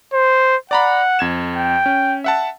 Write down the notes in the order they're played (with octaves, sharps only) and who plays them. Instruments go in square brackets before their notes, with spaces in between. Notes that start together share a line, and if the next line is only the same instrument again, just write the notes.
[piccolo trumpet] C5
[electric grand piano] D5 A#5 B5 [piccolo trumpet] F#5
[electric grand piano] F2 G#6 E7
[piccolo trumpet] G5
[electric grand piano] C#4
E5 F#5 A5